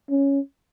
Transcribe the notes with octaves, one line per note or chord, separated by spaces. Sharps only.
C#4